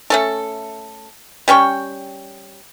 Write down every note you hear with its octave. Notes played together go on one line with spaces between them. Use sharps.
A3 C#4 A4
G3 C#4 G5 C#6